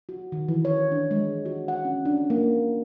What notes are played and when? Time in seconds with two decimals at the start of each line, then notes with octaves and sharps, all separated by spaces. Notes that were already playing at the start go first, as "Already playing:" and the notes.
0.09 F#4
0.32 D#3
0.48 E3
0.65 C#5
0.92 D4
1.11 G#3
1.46 F#4
1.68 F#5
1.85 C#4
2.05 D4
2.30 A#3